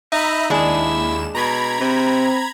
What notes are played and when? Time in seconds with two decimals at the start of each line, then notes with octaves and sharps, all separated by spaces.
0.12 D#4 E5 A#5 B5
0.50 D#2 G#3 D4 E4 G#4 E7
1.35 B2 A#5 B5 G#6
1.80 C3 C4